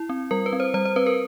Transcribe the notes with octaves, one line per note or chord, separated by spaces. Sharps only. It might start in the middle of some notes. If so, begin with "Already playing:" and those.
Already playing: E4
C4
G3 A#4
B4
C4
C5
G3 C5
C5
C4 B4
A#4